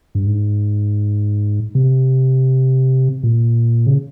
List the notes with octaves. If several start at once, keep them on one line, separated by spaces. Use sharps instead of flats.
G2
G#2
C3
A#2
C#3